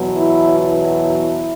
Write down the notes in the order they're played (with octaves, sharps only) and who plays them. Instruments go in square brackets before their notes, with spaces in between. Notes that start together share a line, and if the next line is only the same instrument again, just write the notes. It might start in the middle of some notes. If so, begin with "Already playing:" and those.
Already playing: [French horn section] E2 B2 F#3
E4
E4